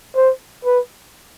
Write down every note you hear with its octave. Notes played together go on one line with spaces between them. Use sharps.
C5
B4